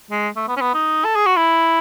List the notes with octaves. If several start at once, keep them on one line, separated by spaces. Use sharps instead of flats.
G#3
A3
B3
C#4
B3
D#4
A4
G#4
F#4
E4